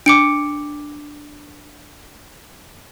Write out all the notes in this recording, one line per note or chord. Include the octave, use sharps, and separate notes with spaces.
D4 D6 C#7 D7